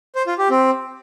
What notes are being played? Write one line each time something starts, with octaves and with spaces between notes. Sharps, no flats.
C5
F4
G4
C4